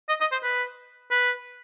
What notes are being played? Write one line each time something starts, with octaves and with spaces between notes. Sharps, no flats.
D#5
D#5
C5
B4
B4